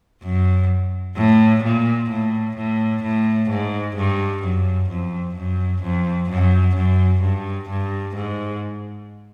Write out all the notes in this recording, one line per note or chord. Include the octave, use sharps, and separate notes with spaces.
F#2
A2
A#2
A2
A2
A2
G#2
G2
F#2
F2
F#2
F2
F#2
F#2
G2
G2
G#2